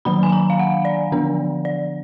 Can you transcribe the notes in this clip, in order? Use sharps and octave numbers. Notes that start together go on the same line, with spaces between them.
D#3 F#3 A#3 D4 B5
G#5
A#5
F5
F#5
D5
D3 F3 B3 D4
D5